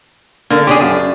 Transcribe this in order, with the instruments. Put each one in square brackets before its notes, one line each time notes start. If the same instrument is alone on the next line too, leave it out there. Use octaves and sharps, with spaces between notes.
[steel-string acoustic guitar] D3 [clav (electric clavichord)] A#3
[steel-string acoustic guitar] C#3 D4 [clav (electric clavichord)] G4 G#4
[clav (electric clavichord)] F#2